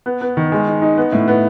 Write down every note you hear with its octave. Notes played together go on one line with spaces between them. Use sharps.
B3
B3
D#3
G#3
D#4
D#4
B3
A2
B3